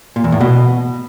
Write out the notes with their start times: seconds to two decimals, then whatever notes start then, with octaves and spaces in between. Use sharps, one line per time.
0.16 A#2
0.24 E2
0.32 A2
0.41 B2